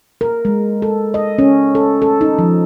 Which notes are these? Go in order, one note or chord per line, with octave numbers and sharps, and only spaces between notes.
A#4
G#3
A4
D#5
C#4
A4
A4
D#4
F3